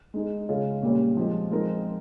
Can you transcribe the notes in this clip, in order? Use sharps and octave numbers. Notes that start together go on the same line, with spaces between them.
G#3 D#4 G#4
C#3 G#3 C#4 F4 G#4
A#2 G3 A#3 C#4
F3 G#3 C4
F3 G#3 C4 D#4 A#4